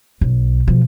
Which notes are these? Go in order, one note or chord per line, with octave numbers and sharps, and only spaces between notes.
B1
B2 F3